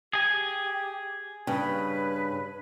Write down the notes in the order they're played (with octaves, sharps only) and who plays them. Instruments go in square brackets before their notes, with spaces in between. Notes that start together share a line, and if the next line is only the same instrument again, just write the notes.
[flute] G4 [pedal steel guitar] G#4 G#5
[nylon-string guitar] G2 C#3 [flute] B4